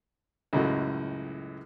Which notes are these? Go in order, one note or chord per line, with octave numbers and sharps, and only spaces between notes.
C#2 F#2 A2 F#4 A4 D#5